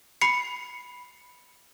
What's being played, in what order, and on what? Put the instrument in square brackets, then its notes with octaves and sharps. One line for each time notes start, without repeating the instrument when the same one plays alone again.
[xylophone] B5 C7 C#7